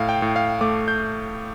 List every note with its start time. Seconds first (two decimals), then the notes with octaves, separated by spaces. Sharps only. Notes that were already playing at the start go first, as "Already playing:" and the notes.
Already playing: A2 F5
0.09 G5
0.22 A2
0.36 F5
0.61 A3 D6
0.88 G6